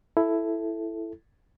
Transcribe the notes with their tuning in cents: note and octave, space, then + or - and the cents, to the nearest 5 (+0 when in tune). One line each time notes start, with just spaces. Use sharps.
E4 +10 A4 +0